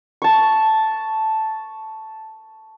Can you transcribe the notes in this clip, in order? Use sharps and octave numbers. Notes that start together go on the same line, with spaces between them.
A5 C#6